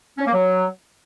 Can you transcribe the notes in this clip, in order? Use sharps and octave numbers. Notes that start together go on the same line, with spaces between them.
C#4
A#3
F#3